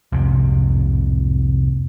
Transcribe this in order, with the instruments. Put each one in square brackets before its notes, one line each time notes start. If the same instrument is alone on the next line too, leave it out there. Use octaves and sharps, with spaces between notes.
[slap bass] C2 F2 G#2 C3